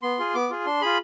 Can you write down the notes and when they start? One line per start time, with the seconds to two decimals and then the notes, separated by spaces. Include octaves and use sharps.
0.02 B3 C6
0.19 F4 G#4
0.34 B3 D6
0.50 F4 G#4
0.66 D4 C6
0.81 F4 G#4 B5